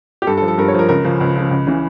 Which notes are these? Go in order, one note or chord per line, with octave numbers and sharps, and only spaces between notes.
G4
G2 A4
A4
F3
A4
G2 A#4
C#5
F3 A#4
C#2 A#4
C#3 F3
C#2
C#3 F3
C#2
C#3 E3